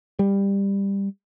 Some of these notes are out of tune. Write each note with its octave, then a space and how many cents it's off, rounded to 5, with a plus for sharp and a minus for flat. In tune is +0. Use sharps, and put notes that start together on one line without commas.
G3 +15